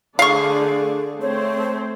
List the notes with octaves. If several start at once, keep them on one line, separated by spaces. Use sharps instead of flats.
D3 A3 G#4 D5 F5 C#6
A3 C4 C5 C#5